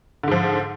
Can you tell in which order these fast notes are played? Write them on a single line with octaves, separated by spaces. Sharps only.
D3 G#2 F3